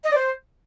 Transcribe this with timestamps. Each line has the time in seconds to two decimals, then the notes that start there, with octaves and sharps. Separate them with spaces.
0.05 D#5
0.11 D5
0.16 C5